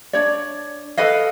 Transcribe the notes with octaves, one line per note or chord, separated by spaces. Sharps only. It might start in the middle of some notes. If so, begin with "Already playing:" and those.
D4 C#5 D5
A4 B4 D#5 F5